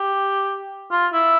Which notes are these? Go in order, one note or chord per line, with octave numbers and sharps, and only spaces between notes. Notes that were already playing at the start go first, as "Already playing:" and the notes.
Already playing: G4
F4
E4